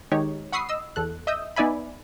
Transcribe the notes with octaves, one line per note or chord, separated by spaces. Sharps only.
D#3 G#3 D#4 G4 C#5
F#5 B5 C#6 D#6 E6 C7
D#5 E6
E2 A4 F#6
D#5 E5 D#6 E6 G6
B3 D#4 D5 E5 G#5 B5